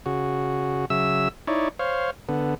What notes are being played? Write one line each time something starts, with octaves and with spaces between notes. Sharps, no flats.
C#3 F#4
C#3 F#3 E5 E6
D#4 E4 C#5 D5
C5 C#5 F5
D3 B3